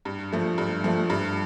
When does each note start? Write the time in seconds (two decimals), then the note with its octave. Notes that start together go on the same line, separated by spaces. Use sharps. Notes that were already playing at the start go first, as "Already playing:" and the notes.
0.05 G2
0.33 F3 A3
0.58 G2
0.84 F3 A3
1.10 G2